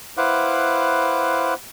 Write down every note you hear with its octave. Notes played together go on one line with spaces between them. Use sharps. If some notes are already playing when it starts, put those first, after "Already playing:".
E4 B4 C5 F5 F#5 D6